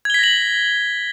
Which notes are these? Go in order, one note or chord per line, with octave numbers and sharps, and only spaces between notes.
G#6 A#6 B6 F#7 G7